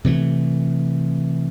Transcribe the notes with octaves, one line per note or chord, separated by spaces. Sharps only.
C3 E3 A3